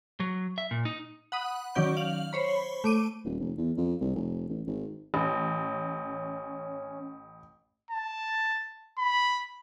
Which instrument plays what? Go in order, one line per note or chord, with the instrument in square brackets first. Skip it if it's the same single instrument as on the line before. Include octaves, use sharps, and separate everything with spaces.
[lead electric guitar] F#3
E5
A#2
D#4
[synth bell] F#5 B5 D#6
D#3 F#3 C#4 D5 G6
F5 F#7
C5 C#5 B5
A3 D6 D#7
[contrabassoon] D#1
F1
E2
F2
C2
F1
A1
G#1
[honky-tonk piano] A1 [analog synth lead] C#4
[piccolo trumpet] A5
B5